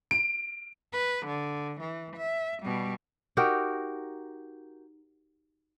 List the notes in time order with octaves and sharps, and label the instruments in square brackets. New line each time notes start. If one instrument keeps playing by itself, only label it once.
[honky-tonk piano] D7
[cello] B4
D3
E3
E5
B2 G3
[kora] D#4 F#4 G4 A#4